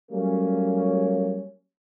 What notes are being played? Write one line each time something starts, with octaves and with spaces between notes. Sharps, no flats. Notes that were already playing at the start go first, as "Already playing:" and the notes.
F#3 G3 A3 A#3 C#4